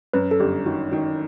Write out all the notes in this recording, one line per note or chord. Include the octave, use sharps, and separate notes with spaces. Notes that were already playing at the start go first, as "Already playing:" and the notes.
F#2 B4
A4
G1 G4
D#3 F#4
D#3 F#4